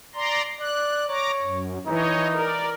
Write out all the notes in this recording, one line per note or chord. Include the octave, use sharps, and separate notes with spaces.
D5 A#5 C6
D5 F#6
C#5 A#5 D6
F#2
E3 D#4 C#5 D#5
A#4 D5